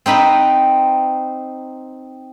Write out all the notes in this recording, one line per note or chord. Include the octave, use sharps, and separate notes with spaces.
C4 D#4 B4 B5